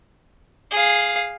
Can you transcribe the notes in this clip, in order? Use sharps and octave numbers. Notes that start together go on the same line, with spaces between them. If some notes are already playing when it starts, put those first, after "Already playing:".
G#4 F5